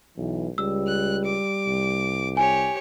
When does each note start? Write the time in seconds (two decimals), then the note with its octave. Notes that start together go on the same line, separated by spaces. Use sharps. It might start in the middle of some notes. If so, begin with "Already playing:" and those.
0.18 B1 E3
0.58 C#2 G3 E6
0.87 F#6
1.25 D6
1.67 C2
2.37 G4 C#5 G#5